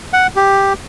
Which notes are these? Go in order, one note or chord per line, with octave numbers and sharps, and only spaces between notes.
F#5
G4